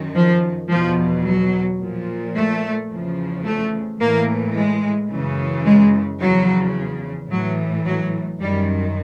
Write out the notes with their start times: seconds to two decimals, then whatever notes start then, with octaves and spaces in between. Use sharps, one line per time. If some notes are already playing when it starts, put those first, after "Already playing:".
Already playing: F#2 D#3
0.15 F3
0.70 E2 B2 F3
1.26 F#3
1.80 A#2 F3
2.35 A3
2.90 E2 C#3 F3
3.45 A3
4.00 A2 E3 A#3
4.55 G#3
5.10 F#2 C#3 E3
5.66 G#3
6.20 E2 C#3 F3 F#3
7.30 A2 E3 F#3
7.85 F#3
8.40 F#2 D#3 G3